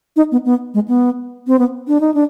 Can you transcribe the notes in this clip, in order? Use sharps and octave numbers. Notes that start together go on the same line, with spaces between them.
D#4
B3
B3
G#3
B3
C4
B3
D4
D#4
D4